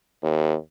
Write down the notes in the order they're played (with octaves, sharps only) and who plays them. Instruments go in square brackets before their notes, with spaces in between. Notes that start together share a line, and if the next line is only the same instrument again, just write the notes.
[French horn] D#2